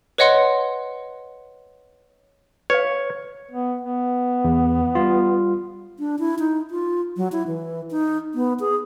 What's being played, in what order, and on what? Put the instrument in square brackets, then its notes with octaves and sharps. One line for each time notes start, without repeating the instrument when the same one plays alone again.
[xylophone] B4 C#5 D#5 F#5 C6
[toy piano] B4 F5 [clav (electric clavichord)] C#5
[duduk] B3
B3
[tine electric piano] E2
G3 F4
[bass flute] D4
E4
D#4
F4
F#3
E4
E3
D#4
B3
G#4